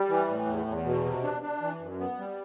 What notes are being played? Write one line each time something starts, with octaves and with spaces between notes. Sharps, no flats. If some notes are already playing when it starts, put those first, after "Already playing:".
Already playing: G3
E3
A2
E2
E2
B2
C3
D4
D4
E3
F#2
B3
G3